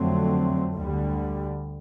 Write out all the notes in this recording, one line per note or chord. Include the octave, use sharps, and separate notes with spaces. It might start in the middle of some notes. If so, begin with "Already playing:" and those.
Already playing: F2 D3 F#3 A3 C4
D2 D3 G3